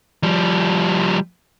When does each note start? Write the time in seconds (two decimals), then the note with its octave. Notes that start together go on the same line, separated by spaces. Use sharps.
0.23 F3 G3